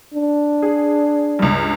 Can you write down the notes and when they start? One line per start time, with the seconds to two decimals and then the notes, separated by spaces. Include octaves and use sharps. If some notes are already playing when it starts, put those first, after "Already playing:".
0.14 D4
0.62 G#4
1.39 C#2 G2